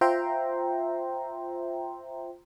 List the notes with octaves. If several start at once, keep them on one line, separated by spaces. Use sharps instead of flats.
F4 C5 E5 G5 A#5 C6